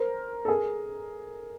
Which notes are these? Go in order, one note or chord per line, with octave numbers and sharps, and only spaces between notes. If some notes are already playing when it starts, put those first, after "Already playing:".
Already playing: A#4 C5
A4
G#4 A#4